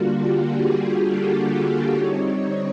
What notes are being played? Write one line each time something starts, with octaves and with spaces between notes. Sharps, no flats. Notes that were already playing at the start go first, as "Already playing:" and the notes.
Already playing: D3 G3 A#3 D4 F4 F#4
G4
G#4
G#4
A4
D3 G3 C4 D#4 C#5
C#5